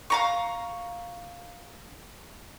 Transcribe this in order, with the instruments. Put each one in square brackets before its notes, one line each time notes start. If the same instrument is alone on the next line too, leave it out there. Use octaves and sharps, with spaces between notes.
[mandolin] F5 A#5 C#6